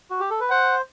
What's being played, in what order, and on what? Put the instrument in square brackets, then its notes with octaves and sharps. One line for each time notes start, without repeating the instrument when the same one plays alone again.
[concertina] F#4
G4
A4
B4
[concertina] C5 [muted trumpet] F#5